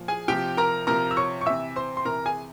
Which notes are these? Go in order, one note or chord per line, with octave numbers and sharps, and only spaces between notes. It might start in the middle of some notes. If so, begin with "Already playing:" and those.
Already playing: A#2 F3
G#4 G#5
C3 F3 G4 G5
A#4 A#5
C3 F3 A#4 A#5
E6
C#5 C#6
C#6
C3 E3 E5 E6
C5 C6
C6
C3 E3 A#4 A#5
G#4 G#5